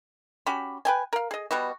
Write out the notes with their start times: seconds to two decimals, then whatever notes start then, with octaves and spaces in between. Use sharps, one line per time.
0.46 C#4 F#4 G4 B5
0.85 B4 G5 G#5
1.13 A#4 F5
1.31 G#4 D#5
1.51 B2 G3 B3 F#4